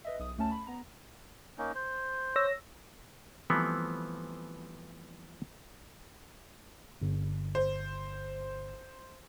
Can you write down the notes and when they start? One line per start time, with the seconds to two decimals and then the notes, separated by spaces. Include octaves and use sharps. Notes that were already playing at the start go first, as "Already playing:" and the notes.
0.05 B4 D#5 E5
0.19 B1 D#6
0.37 D2 A3 C#4 A5
0.51 B5
0.67 B3 A#5
1.58 A#3 C#4 D#4
1.75 C5
2.36 C#5 E6 A#6
3.50 E3 F3 G3 A3 B3 C4
7.02 G1
7.55 C5